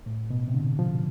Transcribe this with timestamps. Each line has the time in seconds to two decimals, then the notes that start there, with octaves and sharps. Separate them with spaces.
0.06 A2
0.30 B2
0.48 C3
0.54 D3
0.79 F3